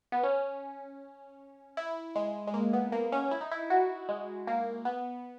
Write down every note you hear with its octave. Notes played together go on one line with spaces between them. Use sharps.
B3
C#4
E4
G#3
G#3
A#3
B3
A#3
C#4
E4
D#4
E4
F#4
G#3
A#3
B3